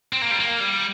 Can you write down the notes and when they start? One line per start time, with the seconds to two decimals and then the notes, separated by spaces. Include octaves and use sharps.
0.13 C4
0.22 A#3
0.31 G3
0.40 A#3
0.60 G3